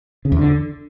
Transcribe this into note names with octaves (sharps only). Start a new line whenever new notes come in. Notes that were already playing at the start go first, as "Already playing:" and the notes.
C#3
E2
D3